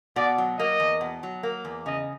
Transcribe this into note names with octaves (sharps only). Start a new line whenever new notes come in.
B2 D5
F#3
A#3 D#5
E2
B2
F#3
A#3
E2
C#3 D#5